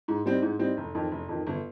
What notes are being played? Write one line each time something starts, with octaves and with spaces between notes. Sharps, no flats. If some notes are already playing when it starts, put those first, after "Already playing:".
G#2
G3 C4 D#4
G#2
G3 C4 D#4
F1
F2 D#3
F1
F2 D#3
G1